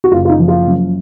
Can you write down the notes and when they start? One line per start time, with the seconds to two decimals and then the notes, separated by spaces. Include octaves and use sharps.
0.04 F#4
0.12 F#1 F4
0.25 F4
0.29 D#4
0.39 F3
0.48 F4
0.67 F#2